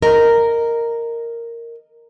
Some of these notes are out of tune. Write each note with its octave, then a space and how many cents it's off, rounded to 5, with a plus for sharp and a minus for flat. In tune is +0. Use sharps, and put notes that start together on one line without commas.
A#4 -5 D#5 +0